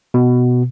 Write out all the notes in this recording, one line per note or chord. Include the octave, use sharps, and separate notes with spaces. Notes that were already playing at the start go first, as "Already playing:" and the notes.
B2